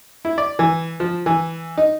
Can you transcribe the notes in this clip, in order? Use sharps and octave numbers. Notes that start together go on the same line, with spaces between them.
E4
D5
E3
F3
E3
D#4